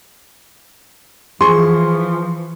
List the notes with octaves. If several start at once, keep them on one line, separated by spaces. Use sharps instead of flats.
E3 F3 G#4 C6 C#6